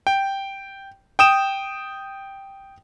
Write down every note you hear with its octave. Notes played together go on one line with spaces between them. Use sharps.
G5
G5 D#6 E7